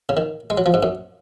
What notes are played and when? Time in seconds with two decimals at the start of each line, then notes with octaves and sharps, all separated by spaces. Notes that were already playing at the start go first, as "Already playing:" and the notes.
0.09 C#3
0.17 D#3
0.50 G#3
0.58 F#3
0.66 F3
0.74 G#2
0.83 F#2